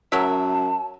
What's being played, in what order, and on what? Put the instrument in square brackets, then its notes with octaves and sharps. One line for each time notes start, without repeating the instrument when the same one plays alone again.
[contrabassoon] F#2 [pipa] F#3 A#4 E5 [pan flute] A5